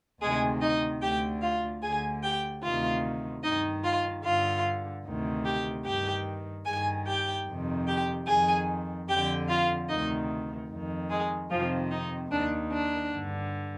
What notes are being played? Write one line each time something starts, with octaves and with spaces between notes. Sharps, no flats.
D2 C3 D#3 G#3 G#4
D#4 D#5
D2 D3 G4 G5
F4 F5
D2 D3 G#4 G#5
G4 G5
D2 C3 D#3 F4 F5
G2 D#3 D#4 D#5
F4 F5
G2 D3 F4 F5
D2 C3 D#3
G4 G5
G2 D#3 G4 G5
G2 D#3 G#4 G#5
G4 G5
F2 C3 D#3
G4 G5
F2 D#3 G#4 G#5
F2 D3 G4 G5
F4 F5
D2 C3 D#3 D#4 D#5
F2 D#3
G#3 G#4
F2 C3 D#3 F3 F4
D#4
D#2 D#3 D4
D4
G2 D3